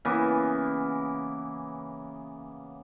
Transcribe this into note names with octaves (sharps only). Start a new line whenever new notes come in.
C#3 E3 A#3 B3